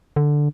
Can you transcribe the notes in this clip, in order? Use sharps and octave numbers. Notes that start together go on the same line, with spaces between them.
D3